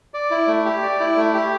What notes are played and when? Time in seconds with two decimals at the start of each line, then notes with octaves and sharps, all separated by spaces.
0.14 D5
0.31 E4
0.47 A3
0.65 G4
0.83 D5
1.00 E4
1.16 A3
1.34 G4